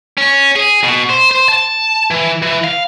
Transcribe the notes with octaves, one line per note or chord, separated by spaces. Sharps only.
C#4
G#4
B2
C5
C5
A5
E3
E3
F5